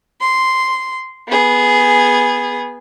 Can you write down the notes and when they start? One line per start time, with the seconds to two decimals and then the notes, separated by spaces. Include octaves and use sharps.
0.21 C6
1.28 B3 G#4